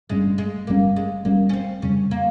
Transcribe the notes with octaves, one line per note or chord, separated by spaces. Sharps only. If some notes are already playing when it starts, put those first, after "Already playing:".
G1 G2 G3 G#3 C#4
G#3
G1 G2 G3 A#3 C#4
G#3
G1 G2 G3 A#3 C#4
C#4
C4
F2 C#3 G3 C#4
A#3